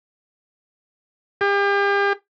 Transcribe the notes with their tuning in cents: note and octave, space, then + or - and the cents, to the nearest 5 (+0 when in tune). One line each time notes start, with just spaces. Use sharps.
G4 +40